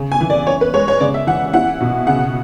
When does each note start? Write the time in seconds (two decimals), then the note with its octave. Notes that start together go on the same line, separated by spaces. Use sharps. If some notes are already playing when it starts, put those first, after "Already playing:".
Already playing: C#3
0.12 G#5
0.21 E3
0.30 D5
0.47 E3 C#5
0.61 B4
0.74 G#3 C#5
0.88 C#5
1.00 C#3 D5
1.14 E5
1.27 E3 F#5
1.54 E4 F#5
1.80 B2
2.07 C#3 F#5